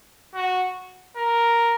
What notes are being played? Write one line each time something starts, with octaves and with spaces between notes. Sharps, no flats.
F#4
A#4